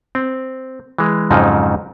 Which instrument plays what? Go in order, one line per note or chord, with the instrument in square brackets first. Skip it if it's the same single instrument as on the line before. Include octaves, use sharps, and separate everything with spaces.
[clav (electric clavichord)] C4
E3 G#3
F2 G#2 C#3 F3 F#3 D#4